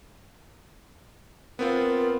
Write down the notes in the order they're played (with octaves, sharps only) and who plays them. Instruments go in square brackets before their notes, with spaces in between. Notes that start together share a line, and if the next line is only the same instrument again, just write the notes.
[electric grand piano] B3 C4 F4 [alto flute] A#4